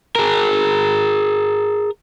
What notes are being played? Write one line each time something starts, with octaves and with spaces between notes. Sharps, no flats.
G#4 A#4